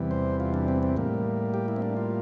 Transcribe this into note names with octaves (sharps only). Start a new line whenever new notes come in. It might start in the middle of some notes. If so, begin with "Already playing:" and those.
Already playing: E2 C3 E3 G3
C5
F4
D4
C4
C4
A2 G3 A#3
G4
E4
C4
D4
F4